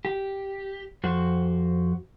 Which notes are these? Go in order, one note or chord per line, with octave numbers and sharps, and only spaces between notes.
G4
F2 F#4 C5